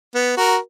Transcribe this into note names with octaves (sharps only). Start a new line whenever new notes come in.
B3
F#4 A#4